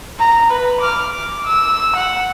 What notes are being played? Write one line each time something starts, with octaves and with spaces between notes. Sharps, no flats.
A#5
B4
D6 F6
D6
E6
F#5